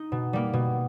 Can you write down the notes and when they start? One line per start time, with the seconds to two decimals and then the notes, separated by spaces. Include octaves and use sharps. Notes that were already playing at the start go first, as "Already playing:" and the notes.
Already playing: D#4
0.12 B2
0.33 G3 A#3
0.53 B2